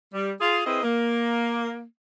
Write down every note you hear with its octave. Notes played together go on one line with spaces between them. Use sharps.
G3
F4 G#4
C4 E4 G#4 B4 D#5
A#3